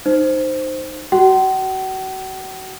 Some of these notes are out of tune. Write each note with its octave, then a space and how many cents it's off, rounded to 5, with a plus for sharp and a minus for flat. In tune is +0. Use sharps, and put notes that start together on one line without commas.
D#4 -20 C5 +0
F#4 +30 F#5 +45